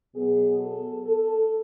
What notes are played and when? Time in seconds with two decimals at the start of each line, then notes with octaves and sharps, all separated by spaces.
0.16 B2 F#3 B3 G#4
0.60 A4
1.04 A4